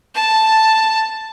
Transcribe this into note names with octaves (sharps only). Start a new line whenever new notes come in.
A5